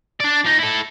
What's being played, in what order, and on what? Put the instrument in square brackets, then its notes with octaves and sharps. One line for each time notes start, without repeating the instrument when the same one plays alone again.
[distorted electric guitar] D4 D5
F3 D#4
E4 A4